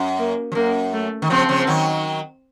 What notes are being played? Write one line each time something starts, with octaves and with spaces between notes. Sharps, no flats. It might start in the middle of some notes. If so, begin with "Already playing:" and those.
Already playing: F#2
A#3
F3
F#2 A#3
A3
D#3
C#3 F3 C4
C#3 F3
D#3 F#3